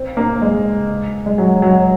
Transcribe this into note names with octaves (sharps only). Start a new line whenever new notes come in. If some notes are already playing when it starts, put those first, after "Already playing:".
Already playing: C4
A#3
G#3
G#3
F#3
F#3